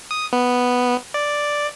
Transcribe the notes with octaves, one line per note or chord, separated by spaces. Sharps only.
D#6
B3
D5